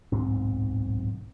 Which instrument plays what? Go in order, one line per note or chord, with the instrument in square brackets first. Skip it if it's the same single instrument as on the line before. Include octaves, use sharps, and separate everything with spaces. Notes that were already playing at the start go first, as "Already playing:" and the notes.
[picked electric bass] D1 B1 G#2 C4